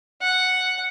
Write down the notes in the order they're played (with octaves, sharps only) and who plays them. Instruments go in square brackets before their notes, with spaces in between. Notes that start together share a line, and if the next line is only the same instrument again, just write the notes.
[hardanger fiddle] F#5